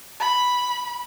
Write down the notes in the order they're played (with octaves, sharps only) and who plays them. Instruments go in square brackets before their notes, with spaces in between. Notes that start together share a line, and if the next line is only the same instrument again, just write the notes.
[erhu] B5